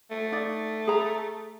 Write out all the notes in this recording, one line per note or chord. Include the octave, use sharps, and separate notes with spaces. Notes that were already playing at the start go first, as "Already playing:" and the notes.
A3
D#4 D5
G#4 A#5